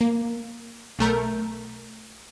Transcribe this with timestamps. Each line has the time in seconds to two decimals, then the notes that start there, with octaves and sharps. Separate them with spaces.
0.01 A#3
0.99 B1 A3 A#4 G6